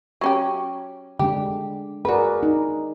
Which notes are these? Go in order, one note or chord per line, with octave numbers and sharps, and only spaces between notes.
F#3 C#4 G4
D3 G#3 D4 G4
F#4 G#4 A#4 B4 D5
D#4